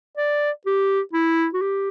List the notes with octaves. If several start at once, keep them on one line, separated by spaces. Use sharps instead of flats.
D5
G4
E4
F#4
G4